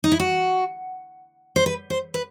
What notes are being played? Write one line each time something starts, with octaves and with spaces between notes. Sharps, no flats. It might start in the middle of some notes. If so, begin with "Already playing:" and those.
D#4
E4
F#4
C5
B4
C5
B4